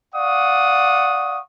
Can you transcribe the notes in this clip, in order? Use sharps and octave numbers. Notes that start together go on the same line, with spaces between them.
D5 F5 F#5 C#6 D#6